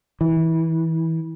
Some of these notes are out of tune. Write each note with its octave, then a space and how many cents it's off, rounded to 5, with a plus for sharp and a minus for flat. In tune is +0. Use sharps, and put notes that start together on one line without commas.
E3 -25